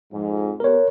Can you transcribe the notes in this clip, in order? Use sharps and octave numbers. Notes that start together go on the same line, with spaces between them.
F2 G#2
B3 G4 A#4 C#5